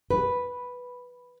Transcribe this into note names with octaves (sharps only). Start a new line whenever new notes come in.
B4